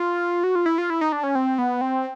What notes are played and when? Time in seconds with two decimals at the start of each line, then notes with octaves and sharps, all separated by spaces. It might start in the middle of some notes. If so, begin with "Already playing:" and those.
Already playing: F4
0.44 F#4
0.55 F4
0.66 E4
0.78 F4
0.90 E4
1.01 D#4
1.12 D4
1.23 C#4
1.35 C4
1.58 B3
1.81 C4